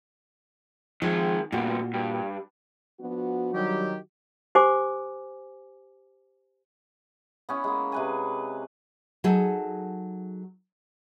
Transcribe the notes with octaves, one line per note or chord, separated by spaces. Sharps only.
D#3 F3 G#3
D2 G2 A#2 F#4
G2
F3 B3 D4 F#4
D#3 F#3 G3 G4
G4 C5 G#5 D6
B3 C#4 E4
G#3 A#3
C3 B4 G#5
F#3 D#4 G#4 A4